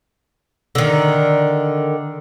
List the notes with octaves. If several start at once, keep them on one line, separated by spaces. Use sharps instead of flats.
D3 D#3